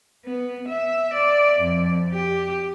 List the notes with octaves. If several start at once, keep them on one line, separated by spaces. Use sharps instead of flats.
B3
E5
D5
F2
G4